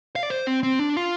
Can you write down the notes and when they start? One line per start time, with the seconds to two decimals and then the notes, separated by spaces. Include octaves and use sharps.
0.16 F5
0.23 D5
0.30 C5
0.47 C4
0.63 C4
0.79 D4
0.97 F4